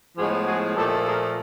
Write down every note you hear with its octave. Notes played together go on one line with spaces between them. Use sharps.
A2 F3 G#3 B3 F#4 G#4
F#4 G#4
A#2 F3 A3 G4 A4
G#4 A#4